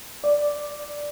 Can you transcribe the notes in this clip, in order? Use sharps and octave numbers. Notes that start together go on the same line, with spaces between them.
D5